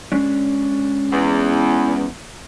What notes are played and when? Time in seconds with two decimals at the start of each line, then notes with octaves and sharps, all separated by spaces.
0.12 G#3 C#4 D4
1.12 E2